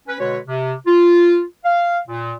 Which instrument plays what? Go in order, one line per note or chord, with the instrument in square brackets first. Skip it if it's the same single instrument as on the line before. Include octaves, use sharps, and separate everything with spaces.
[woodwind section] C#4 B4
B2 D3 G#3 F#4 B4 C#5
C3
F4
F5
A#2